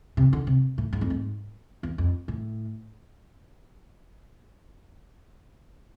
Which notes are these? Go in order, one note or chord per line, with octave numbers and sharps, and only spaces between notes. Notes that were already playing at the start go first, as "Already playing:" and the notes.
C3
D3
C3
A2
G#2
F2
G#2
E2
F2
A2